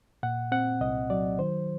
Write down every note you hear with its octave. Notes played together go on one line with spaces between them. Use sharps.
A#2 F#5
C4 F#5
C2 D#5
F#3 D5
D#3 C5